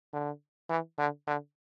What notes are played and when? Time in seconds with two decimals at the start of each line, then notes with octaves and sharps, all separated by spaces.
0.13 D3
0.69 E3
0.98 D3
1.27 D3